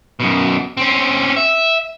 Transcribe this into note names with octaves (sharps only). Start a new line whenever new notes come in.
F#2 B2
C4 C#4
E5